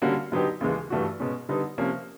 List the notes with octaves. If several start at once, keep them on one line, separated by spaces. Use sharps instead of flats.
D3 G3 A#3 C#4 F#4
D3 F#3 B3 D#4 G4
D#2 C#3 E3 G#3
G2 E3 A3 D4 F#4
B2 G#3 C#4
D3 G3 B3 D#4
C3 F3 A#3 C#4